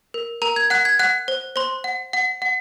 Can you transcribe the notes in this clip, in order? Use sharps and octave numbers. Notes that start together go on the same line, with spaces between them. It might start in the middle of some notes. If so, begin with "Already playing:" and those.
A#4
A#4 A#5
G#6
F#5 F#6
G#6
F#5 F#6
C5
C5 C6
F#5
F#5
F#5